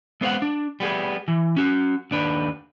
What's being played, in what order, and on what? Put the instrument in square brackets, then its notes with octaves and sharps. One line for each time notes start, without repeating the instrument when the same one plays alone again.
[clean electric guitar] G#3 B3 C5 C#5 F5 F#5
D4
G3 B3 G#4
E3
C#4 F#4
D#2 D4 B4